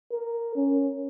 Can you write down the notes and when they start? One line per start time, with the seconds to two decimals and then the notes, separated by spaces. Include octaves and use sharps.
0.12 A#4
0.56 C#4